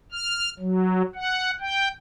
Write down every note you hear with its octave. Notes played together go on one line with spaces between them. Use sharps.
F6
F#3
F#5
G5